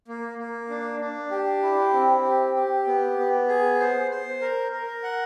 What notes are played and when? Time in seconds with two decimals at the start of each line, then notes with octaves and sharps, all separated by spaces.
0.08 A#3
0.38 A#3
0.70 D4
1.01 D4
1.31 G4
1.63 E4
1.93 C4
2.24 G4
2.56 G4
2.87 B3
3.18 B3
3.48 G#4
3.79 C5
4.11 C5
4.41 A#4
4.72 A#4
5.03 F#5